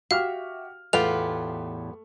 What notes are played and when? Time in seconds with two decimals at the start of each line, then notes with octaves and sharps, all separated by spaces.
0.11 F#4 G4 E5 F5 F6
0.93 E2 A2 A3 B3 F4 G4 F7